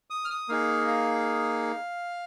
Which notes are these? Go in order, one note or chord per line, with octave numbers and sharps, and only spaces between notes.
D#6
F6
D#6
A#3 D#4 G#4 F5
F5